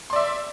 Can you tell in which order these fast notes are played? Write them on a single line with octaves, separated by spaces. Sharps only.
C6 D5 E5